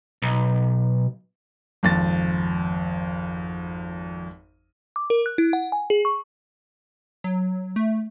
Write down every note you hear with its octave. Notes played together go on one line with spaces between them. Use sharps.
B1
G#1 F2 A6
D6
A#4
F#6
E4
F#5
G#5
G#4
C#6
F#3
A3